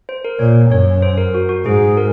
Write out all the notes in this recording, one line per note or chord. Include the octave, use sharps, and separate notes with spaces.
C5
A#4
A#2 C#5
F#2 C#5
C5
A#4
F#4
F#4
G#2 G#4
A#4